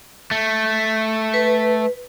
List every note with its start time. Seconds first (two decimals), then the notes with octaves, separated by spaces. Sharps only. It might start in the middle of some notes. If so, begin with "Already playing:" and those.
0.31 A3
1.34 B4